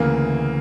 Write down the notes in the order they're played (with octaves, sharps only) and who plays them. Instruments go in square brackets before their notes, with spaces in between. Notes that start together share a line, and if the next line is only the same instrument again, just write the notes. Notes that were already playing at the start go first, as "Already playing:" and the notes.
Already playing: [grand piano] D2 C#3 E3 [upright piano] A#3